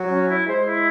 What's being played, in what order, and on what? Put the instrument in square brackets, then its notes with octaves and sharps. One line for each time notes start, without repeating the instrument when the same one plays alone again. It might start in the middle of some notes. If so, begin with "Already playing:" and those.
Already playing: [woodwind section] F#3
[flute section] C#4
E4
[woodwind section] G#3 [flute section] C5
[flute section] E4